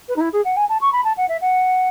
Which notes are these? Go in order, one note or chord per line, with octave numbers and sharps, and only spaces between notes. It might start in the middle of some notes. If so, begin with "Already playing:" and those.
B4
D#4
E4
G#4
F#5
G#5
A5
C#6
B5
A5
F#5
E5
F#5